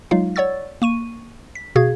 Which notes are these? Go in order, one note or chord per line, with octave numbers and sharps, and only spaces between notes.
F#3 G#3 D#4 F4 F5
C#5 D5 F#5 C#6 E6 A6
A#3 C#6 D#7
B6
B2 F#4 G#4 F5 G#6